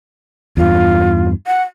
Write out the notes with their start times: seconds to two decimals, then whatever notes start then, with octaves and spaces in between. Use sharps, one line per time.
0.57 E2 G2 F4
1.47 F#5